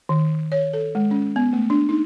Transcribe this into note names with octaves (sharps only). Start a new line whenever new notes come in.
D#3
C#5
A4
G#3
C#4
B3
A3
D4
D#4